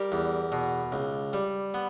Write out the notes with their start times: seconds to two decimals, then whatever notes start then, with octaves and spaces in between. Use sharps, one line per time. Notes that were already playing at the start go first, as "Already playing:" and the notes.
Already playing: G3 G4 A#4
0.12 E2
0.52 B2
0.92 C#2
1.33 G3
1.74 B3